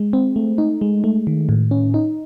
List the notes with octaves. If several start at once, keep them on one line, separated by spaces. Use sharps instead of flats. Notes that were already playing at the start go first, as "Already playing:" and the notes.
Already playing: G#3
C4
A3
D#4
G#3
A3
D#3
A2
C#4
D#4